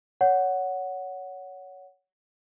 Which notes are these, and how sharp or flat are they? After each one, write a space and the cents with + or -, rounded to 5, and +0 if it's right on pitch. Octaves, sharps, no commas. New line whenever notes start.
C#5 +15 F#5 +0